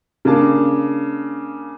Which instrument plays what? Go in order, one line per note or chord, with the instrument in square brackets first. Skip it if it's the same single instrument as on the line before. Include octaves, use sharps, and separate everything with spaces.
[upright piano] C#3 A#3 D4 A5